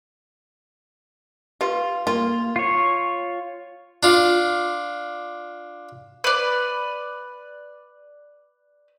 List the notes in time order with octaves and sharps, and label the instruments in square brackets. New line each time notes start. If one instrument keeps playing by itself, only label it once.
[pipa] F4 [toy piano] G4 B4 F5
[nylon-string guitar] A#3 [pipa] F4
[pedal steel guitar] F4 C#5
[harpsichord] D4 F4
[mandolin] B4 D5